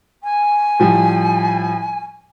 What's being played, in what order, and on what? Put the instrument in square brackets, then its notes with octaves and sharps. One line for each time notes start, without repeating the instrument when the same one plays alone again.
[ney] G#5
[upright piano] A2 F3 G3